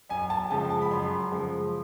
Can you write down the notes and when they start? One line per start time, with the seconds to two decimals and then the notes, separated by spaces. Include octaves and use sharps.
0.09 F#2 G#5
0.30 A5
0.50 C#3 F3 G#3 A5
0.70 A5
0.82 B5
0.91 F#2 C6
1.31 C#3 F3 G#3